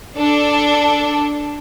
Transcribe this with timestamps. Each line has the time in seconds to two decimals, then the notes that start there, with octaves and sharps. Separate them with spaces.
0.17 D4 A4